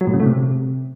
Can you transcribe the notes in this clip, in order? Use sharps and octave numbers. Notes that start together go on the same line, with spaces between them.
F#3
A2
C#3
A3
C3